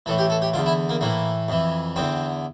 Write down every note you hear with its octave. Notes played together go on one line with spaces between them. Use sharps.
A2 E3 A4
G4
A4
G4
E2 D3 F4
E4
A#3
A2 E3 A#3
F2 E3
E2 D3 C4